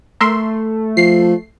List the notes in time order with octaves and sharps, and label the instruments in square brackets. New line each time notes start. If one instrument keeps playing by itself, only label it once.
[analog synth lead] A3 [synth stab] A#4 E5 C6
[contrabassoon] F3 [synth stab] C7